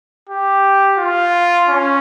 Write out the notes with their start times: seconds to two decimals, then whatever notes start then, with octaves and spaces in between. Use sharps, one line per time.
0.29 G4
0.98 F4
1.69 C#4